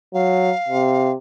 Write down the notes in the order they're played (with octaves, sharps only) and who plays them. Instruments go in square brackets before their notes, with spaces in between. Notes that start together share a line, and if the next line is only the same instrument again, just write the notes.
[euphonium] F#3 [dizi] F5
[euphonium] C3